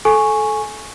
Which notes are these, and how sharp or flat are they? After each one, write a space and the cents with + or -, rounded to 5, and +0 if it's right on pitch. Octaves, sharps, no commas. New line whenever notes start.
A4 -20 G#5 +5 C#6 -5